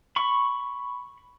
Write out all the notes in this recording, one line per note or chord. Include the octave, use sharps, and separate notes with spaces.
B5 C#6